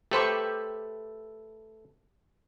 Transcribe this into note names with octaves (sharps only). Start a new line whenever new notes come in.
A3 G4 A4 B4 C5 C#6